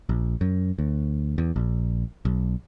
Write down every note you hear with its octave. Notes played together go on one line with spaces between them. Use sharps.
A#1
F#2
D2
E2
A#1
B1